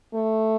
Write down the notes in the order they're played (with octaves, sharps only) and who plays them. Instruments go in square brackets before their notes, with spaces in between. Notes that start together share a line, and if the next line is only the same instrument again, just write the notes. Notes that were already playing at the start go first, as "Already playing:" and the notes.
[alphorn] A3